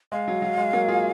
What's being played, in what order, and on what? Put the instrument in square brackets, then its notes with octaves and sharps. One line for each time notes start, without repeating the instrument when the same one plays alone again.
[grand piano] G#3 [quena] F5
[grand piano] F#3
F#3
G#3
F#3 A#3
F4 G#4